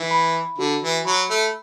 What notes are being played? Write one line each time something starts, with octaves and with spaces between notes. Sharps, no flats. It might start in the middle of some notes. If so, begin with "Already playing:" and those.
Already playing: E3 E5
B5
D3 F#4
E3
F#3 B5
A3